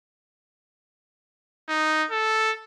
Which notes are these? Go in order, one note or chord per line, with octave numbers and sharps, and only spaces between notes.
D#4
A4